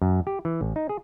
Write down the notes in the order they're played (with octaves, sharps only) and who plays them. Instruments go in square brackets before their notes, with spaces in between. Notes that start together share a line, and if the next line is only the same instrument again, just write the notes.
[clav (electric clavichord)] F#2
G4
E3
A1
D#4
G#4